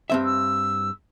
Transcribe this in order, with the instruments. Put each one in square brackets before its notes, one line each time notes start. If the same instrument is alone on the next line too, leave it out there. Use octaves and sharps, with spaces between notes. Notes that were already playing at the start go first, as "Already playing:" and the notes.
[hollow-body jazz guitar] G2 C4 E5
[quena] E6